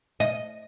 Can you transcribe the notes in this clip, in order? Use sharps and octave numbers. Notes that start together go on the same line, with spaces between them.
D#5